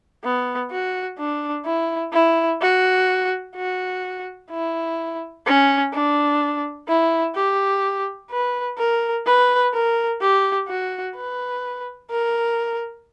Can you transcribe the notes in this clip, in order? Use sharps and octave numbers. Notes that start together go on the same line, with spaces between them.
B3
F#4
D4
E4
E4
F#4
F#4
E4
C#4
D4
E4
G4
B4
A#4
B4
A#4
G4
F#4
B4
A#4